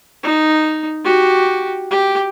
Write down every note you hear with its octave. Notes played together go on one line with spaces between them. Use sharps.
D#4
F#4 G4
G4